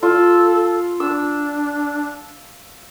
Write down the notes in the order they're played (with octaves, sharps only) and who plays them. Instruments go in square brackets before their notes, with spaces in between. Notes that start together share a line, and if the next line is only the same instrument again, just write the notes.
[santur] F4 [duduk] A4
[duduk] D4 [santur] E6